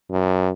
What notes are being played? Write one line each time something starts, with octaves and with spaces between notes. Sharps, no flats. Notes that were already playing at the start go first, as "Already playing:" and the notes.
F#2